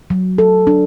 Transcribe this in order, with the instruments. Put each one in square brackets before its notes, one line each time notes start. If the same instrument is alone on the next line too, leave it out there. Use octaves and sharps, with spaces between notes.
[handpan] F#3
A4
D4